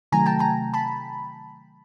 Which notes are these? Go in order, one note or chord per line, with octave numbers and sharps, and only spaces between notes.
C3 D#3 F#3 A3 G#5 A#5
G5 A5
G#5 A#5
A5 B5